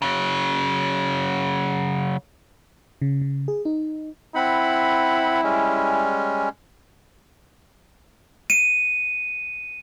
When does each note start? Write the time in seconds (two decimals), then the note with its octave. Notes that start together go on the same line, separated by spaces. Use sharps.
0.02 C#3 F#3
3.02 C#3
3.21 C#3
3.48 G#4
3.65 D#4
4.35 C4 E4 F#5 B5
5.43 G3 G#3 C#4
8.50 C#7 D#7